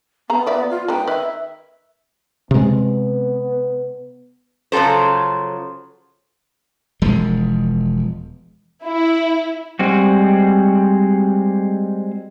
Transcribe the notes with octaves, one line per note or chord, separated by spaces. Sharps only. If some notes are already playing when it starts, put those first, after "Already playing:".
B3 G#4 A#5
F3 D5 E5
F4
G#3 B3 D#4 G5
D#3 B4 D#5 E5
C3 G#3 B3
C#3 F3 F#3 A4 C5
E1 F3 G#3
E4
G3 G#3 C4 F#4